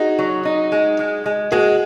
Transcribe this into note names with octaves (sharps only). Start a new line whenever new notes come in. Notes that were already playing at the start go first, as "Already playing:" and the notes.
Already playing: D#4 F#4 G#4
F#3
D#4
G#3
G#3
G#3
G#3 F#4 G#4